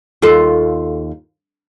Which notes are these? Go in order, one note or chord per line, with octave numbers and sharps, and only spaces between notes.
D#2 F4 A4